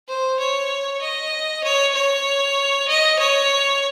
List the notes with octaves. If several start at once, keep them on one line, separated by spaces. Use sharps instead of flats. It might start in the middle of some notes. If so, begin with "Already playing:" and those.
C5
C#5
D#5
C#5
C#5
D#5
C#5